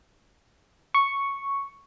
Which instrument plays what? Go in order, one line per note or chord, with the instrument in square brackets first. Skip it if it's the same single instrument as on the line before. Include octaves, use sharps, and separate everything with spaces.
[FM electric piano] C#6